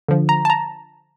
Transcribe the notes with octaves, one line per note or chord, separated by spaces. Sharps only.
D3 F3
A#5
A5
A#5